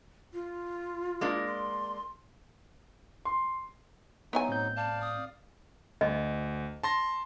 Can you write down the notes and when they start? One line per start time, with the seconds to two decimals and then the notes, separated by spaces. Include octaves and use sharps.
0.33 F4
1.21 G#3 A#3 D4
1.47 C6
3.25 C6
4.33 F#3 B3 D#4 E4 G#5
4.49 A2 C4 G6
4.77 D5 F5 A5
5.01 D#6
6.01 D2 D#5
6.83 A5 C6 A#6